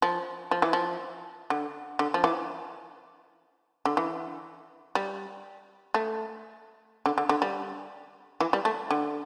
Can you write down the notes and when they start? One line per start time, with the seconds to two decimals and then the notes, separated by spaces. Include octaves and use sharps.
0.02 F3
0.51 F3
0.62 E3
0.73 F3
1.50 D3
1.99 D3
2.14 F3
2.24 E3
3.85 D3
3.97 E3
4.95 G3
5.94 A3
7.06 D3
7.18 D3
7.29 D3
7.42 G3
8.40 E3
8.53 G3
8.65 A3
8.91 D3